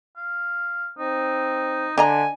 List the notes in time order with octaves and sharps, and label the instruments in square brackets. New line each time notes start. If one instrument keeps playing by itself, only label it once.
[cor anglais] F5
[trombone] C4 [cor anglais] D#4
[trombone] D3 [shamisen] D4 D#5 A#5 [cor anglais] G#5